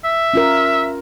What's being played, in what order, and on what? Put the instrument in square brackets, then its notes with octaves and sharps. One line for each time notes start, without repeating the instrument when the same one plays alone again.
[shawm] E5
[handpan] C#4 F4 A#4